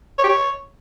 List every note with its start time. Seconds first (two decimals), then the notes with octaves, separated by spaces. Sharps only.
0.19 C#5
0.24 G4
0.29 C#5